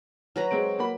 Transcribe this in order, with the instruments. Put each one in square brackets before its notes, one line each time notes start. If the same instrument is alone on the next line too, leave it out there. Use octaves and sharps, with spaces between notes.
[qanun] F#3 B4 A#5
[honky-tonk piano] G#3 C4 D7
A#3 F#4 B5